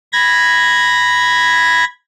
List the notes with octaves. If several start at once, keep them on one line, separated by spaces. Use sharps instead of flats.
B5 G#6 A#6